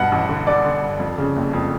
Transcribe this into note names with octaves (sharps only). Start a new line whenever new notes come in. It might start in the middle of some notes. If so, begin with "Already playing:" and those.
Already playing: G2 B2 F#5
A1
D3
D3 D5
D3
G2
F2
C#3
F#1
F2